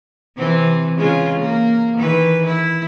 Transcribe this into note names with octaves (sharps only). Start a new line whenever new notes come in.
C3 E3 C4
C#3 G#3 F4
A#3
D#3 E3 B4
E4